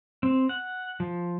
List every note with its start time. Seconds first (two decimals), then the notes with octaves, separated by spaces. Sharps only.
0.23 C4
0.49 F#5
1.00 F3